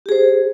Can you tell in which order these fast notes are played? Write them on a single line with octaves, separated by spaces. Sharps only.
G4 G#4 C5